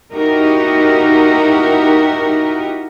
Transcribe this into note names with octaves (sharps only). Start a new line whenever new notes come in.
D#4 E4 F#4 G4 A#4